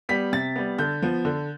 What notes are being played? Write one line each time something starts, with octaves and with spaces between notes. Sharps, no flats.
G3 B3 B6
C3 A6
G3 B3
D3 G6
F3 B3
D3